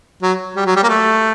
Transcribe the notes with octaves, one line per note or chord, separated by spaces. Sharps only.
F#3
G3
F#3
G3
A#3
A3